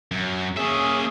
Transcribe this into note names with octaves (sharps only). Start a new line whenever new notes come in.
F#2
A#3 C#4 G#4 E5